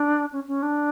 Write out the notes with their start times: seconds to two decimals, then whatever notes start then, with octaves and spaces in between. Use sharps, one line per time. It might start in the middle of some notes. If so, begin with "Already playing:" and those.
Already playing: D4
0.33 C#4
0.48 C#4
0.63 D4